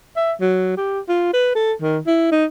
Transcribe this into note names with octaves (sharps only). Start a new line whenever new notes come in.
E5
F#3
G4
F4
B4
A4
D#3
E4
D#4